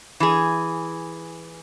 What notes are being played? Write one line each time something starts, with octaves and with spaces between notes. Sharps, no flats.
E3 G#4